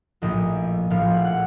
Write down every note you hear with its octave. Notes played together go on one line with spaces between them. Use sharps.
A#1 A2 F3 D#5
A#1 A2 F3 F5
F#5
F#5